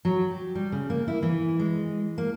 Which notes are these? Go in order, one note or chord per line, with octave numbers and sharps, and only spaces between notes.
F#3
G4
G3
C#3
A#3
E4
E3
G#3
A#3